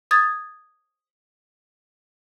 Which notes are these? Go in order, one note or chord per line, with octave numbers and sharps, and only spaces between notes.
D#6 G#6 A6